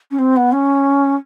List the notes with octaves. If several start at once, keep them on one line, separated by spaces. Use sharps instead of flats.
C#4
C4
B3
C#4